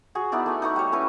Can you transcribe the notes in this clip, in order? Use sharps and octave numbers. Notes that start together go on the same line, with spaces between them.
F#4 G#4
B3 D#4 E4 D5
A3 G#5
D#4 F#5 C#6
G3 C#5
C#4 E4 B4 G#5